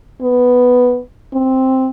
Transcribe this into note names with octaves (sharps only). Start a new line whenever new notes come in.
B3
C4